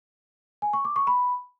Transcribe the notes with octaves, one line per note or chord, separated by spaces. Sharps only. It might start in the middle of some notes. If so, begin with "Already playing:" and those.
G#5
C#6
D6
C#6
B5